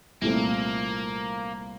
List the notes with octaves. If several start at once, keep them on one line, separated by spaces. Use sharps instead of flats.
C2 A#2 A3 A#3 C4